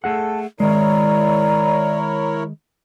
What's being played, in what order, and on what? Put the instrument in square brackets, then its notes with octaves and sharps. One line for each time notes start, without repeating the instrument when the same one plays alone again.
[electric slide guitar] A3 G#4 F#5 [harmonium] A4
[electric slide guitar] D#3 G#3 [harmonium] E4 A#4 C#5 [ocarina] D5 [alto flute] A#5